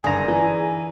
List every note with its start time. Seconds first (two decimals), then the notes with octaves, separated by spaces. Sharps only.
0.04 F#1 G2 D3 D#4 G#4 A4 G#5 A#5
0.28 E3